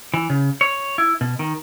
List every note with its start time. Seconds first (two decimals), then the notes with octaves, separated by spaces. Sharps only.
0.14 E3
0.30 C#3
0.61 C#5
0.98 E4
1.21 B2
1.39 D#3